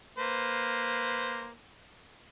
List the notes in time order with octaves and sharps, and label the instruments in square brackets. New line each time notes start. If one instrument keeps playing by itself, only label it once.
[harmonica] A#3 B4 C5